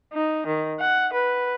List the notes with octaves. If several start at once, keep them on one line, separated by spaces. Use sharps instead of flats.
D#4
D#3
F#5
B4